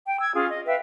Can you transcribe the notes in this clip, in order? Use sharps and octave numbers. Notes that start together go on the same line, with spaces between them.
G5
E6 G#6
C#4 F4 G#4
D#5
B4 E5 F5 G5